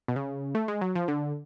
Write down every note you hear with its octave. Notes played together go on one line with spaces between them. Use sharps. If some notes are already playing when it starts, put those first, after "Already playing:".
B2
C#3
A3
G#3
F#3
F3
D3